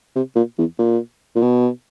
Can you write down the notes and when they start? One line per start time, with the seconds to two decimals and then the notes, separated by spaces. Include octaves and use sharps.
0.15 C3
0.36 A#2
0.58 E2
0.79 A#2
1.36 A#2
1.42 B2